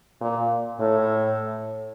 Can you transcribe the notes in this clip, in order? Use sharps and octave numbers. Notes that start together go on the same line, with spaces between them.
A#2
A2